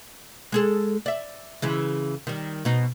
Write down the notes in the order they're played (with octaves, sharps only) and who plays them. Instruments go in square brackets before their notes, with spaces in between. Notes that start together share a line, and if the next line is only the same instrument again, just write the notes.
[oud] G#3 G#4 A4
D5 E5
C#3 E3 G#3
D#3 G3
B2 D#4